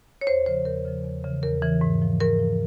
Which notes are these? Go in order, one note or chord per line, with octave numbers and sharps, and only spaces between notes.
C#5
E2 C5
C#3 F3 C5
E2 A#4
C#3 F3
E2
C#3 E3
E2 A#4
C#3 E3
G#2
F3
G#2 A#4
F3